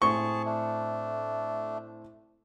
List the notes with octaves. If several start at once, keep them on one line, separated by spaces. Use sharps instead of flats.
A2 C4 G#4 A5 C#6 G7
A3 D4